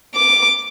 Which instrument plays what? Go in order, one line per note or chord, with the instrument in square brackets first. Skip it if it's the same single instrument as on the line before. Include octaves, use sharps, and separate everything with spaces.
[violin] D6